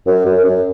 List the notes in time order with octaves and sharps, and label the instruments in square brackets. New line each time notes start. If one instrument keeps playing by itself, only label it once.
[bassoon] F#2
F#2
F#2